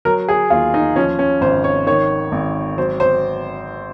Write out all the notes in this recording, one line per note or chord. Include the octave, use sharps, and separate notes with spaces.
F#3 A#4
G#4
D#2 F4
D#4
F3 C#4
C#4
G#1 C5
C#5
D#3 C#5
G#1
F#3 C5
C5